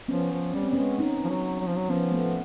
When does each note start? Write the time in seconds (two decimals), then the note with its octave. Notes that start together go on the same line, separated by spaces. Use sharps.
0.08 F3 B3 C#4
0.32 F3
0.54 G3 C#4
0.63 C4
0.70 G3
0.73 G#3 B3 C#4
0.99 C#4 D#4
1.24 F3
1.29 F#3
1.60 F#3
1.67 F3
1.76 F#3
1.89 F3 B3 C#4
2.12 A3 B3